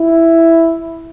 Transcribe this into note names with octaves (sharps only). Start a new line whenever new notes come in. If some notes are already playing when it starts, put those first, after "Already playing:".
Already playing: E4